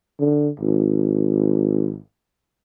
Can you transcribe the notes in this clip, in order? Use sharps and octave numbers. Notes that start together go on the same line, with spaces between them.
D3
G#1